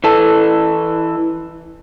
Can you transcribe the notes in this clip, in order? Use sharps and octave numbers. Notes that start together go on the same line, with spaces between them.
E3 A4